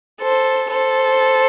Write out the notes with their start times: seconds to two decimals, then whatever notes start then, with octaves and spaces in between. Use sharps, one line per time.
0.22 A4 C5
0.70 A4 C5